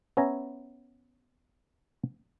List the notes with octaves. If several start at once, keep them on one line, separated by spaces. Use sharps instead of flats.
B3 C#4 E5 G#5 A#5